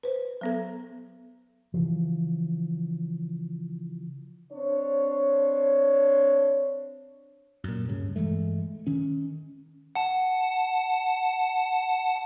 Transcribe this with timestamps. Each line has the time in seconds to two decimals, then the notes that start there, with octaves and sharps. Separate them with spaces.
0.03 B4 C5
0.41 F#3 B3 A4
1.74 C#3 E3 F3
4.52 C4 D4 C#5
7.64 F#2 A#2
7.89 D1 G2 C#3
8.16 G2 E3 G#3 A3
8.87 D#3 C#4
9.95 F#5 A5